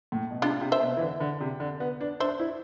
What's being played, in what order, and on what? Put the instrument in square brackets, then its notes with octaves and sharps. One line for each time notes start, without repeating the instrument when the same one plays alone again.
[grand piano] A2
B2
[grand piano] C3 [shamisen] D4 F4
[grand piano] C3
[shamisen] C5 E5
[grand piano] B2
E3
D3
D3
C3
D3
B3
D4
[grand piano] D4 [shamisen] C5 E5
[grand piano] E4